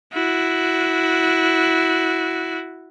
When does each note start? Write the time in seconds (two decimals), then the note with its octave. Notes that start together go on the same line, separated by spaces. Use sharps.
0.13 E4 F#4